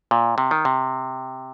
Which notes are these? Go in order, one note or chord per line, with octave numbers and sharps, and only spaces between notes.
A#2
C3
D#3
C3